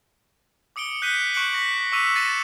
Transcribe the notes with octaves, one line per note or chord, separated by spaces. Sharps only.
D6 D#6 C#7 D7 G7
F#6 G6 B6 C#7 D#7 G7
C#6 F#6 C#7 D7 F#7
A#6 B6
C#6 D6 E6 B6 D#7 F7
A6 A#6 C7 C#7 D#7 E7